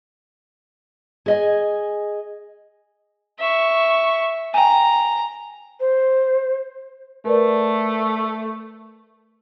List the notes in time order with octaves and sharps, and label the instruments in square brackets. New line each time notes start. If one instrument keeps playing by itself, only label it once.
[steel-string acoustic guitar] G#4 D#5 G#5
[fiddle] E5 C#6
[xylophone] G5 G#5 [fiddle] A#5
[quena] C5
[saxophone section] A3 [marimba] A#4 B4 D5